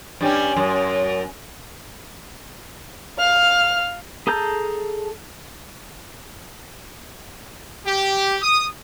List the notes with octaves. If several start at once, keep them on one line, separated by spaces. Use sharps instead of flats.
G2 G3 C#4
F#2
F5 F6
G#4 A4 A5 A#5 G6
G4
D#6